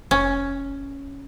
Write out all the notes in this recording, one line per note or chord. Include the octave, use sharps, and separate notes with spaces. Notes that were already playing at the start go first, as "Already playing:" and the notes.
F1 C#4